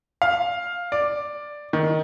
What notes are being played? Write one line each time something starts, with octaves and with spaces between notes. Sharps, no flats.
F5
D5
D#3